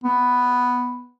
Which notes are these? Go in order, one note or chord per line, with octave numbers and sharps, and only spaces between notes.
B3